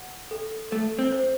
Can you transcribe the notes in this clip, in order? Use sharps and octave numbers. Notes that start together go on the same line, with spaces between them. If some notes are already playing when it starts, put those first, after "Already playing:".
Already playing: F#5
A4
A3 A4
C4
C5